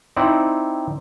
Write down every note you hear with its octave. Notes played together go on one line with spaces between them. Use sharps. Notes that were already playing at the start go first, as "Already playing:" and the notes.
C4 D#4 E4 D5 F#5